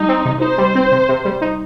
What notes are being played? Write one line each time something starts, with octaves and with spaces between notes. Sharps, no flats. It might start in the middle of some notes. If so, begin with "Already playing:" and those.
Already playing: G3 D#4
C4
C3
D#4 C5
G3
C4
C3
C3
G3
D#4